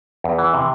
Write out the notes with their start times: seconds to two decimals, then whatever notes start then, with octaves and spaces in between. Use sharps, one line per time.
0.24 E2
0.38 E3
0.54 C3